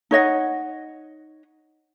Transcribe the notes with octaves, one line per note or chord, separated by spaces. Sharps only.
D#4 C#5 D#5 F#5